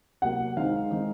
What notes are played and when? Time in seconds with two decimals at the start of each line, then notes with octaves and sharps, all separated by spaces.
0.22 C3 F#3 A#3 F#5
0.57 D#3 G#3 C4 D#4 F5
0.91 D#3 G#3 C4 D#4